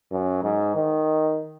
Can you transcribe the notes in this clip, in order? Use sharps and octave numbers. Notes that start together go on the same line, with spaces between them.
F#2
G#2
D#3